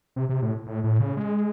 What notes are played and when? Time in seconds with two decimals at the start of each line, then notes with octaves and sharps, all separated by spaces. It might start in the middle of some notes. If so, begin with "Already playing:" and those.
0.16 C3
0.29 C3
0.42 A2
0.66 A2
0.84 A2
1.00 C#3
1.17 G#3